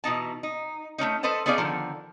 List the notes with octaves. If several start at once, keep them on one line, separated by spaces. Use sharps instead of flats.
B2 E3 D#4 A5
D#4
A3 A#3 C#4 D#4
A4 B4 C5 D#5 A5
B3 C#4 D#4 G#4 D5 F5
D3 D#3 F3